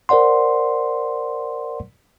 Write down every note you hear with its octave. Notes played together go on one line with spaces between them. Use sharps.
A#4 C5 D5 F#5 C6